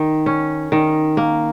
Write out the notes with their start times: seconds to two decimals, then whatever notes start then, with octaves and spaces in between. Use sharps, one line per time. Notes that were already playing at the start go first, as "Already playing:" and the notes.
Already playing: D#3
0.26 C#4
0.72 D#3
1.17 A#3